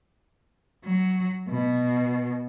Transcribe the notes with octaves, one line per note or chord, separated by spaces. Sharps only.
F#3
B2